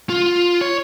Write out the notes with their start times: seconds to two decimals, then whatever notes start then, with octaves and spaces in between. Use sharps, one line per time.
0.10 F4
0.61 C#5